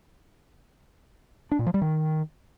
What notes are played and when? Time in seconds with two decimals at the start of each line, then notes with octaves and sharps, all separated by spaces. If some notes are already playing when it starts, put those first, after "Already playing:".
1.52 D4
1.59 A#2
1.67 F3
1.74 G3
1.82 D#3